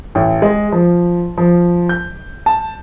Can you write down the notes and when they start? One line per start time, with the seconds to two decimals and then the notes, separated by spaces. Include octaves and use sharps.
0.15 A1
0.42 G#3
0.72 F3
1.37 F3
1.89 G6
2.46 A5